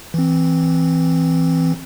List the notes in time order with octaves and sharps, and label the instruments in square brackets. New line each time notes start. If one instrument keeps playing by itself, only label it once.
[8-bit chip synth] E3 C4